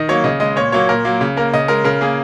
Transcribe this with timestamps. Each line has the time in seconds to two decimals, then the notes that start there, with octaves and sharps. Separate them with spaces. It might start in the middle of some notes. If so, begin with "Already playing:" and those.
Already playing: D#3 D#5
0.08 F#3 A#3 C#5
0.24 C#3 D#5
0.40 G#3 D#5
0.56 A#2 C#5
0.72 F#3 A#3 C#5
0.89 A#2 A#4
1.05 F#3 A#3
1.21 C#3
1.36 A#3 A#4
1.54 C#3 D#5
1.68 G#3 A#4
1.84 C#3 A#4
2.01 A#3 G#4